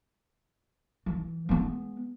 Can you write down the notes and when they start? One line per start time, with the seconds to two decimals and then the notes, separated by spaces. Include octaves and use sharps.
1.06 E3
1.49 G#3 B3